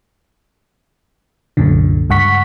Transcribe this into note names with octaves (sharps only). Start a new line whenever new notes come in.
C2 F#2 A#2 D3
C#2 G2 F#5 C#6 B6